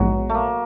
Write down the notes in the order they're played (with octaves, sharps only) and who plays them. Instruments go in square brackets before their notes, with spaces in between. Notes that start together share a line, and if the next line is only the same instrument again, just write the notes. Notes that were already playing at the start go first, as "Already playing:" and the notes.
Already playing: [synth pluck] A#1 G#2 E3 G#3 B3 [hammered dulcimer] F#3
[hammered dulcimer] A3
A#3